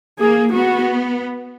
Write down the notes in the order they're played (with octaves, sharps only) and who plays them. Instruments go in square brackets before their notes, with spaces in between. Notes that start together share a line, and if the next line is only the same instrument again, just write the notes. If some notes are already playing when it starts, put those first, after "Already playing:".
[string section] A#3 [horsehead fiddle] G#4
[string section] B3 [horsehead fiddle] F#4